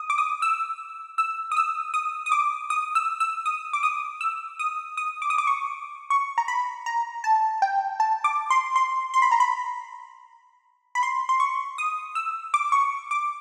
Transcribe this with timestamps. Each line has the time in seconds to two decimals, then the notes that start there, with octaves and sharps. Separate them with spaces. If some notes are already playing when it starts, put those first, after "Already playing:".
Already playing: D#6
0.10 D6
0.18 D#6
0.42 E6
1.18 E6
1.52 D#6
1.57 E6
1.94 D#6
2.26 D#6
2.32 D6
2.70 D#6
2.95 E6
3.20 E6
3.46 D#6
3.73 D6
3.83 D#6
4.21 E6
4.59 D#6
4.97 D#6
5.22 D6
5.30 D#6
5.38 D6
5.47 C#6
6.10 C#6
6.38 A#5
6.48 B5
6.86 A#5
7.24 A5
7.62 G5
8.00 A5
8.24 D6
8.50 C6
8.76 C6
9.14 C6
9.22 B5
9.32 A#5
9.40 B5
10.95 B5
11.03 C6
11.29 C6
11.40 C#6
11.78 D#6
12.15 E6
12.54 D6
12.72 C#6
13.11 D6